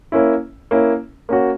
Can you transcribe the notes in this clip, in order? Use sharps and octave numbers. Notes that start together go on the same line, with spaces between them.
A#3 C#4 E4
A#3 C#4 E4
A#3 C#4 F#4